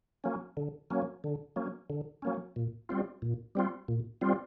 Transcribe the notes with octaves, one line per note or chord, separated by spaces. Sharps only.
F#3 A#3 C#4
D3
F#3 A#3 C#4
D3
F#3 A#3 C#4
D3
F#3 A#3 C#4
A#2
G3 C4 F4
A#2
G3 C4 F4
A#2
G3 C4 F4